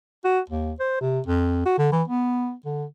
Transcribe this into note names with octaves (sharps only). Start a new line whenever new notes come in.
F#4
D#2
C5
C3
F2
F#4
D3
E3
B3
D3